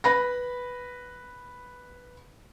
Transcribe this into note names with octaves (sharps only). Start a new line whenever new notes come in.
B4 B5 A#6